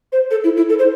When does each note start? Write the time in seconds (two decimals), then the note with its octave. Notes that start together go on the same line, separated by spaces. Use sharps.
0.12 C5
0.31 A4
0.44 E4
0.57 E4
0.69 A4
0.79 C5